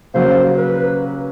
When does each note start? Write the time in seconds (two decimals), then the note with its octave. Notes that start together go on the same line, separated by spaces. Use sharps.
0.14 C#3 F#3 A#3 C#4 F#4 C5
0.57 B4